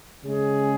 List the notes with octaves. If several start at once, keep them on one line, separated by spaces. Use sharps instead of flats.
C#3 G#3 C#4 G#4